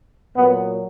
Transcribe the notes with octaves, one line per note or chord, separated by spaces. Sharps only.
A#2 F#3 B3